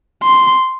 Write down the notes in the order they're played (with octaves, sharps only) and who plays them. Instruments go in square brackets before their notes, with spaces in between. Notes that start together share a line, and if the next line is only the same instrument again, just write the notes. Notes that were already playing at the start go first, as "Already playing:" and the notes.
[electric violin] C6